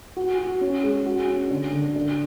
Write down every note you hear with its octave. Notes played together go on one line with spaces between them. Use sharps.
F#4
F#4
C#4
G#3
F#4
C#4
D3
D3
D3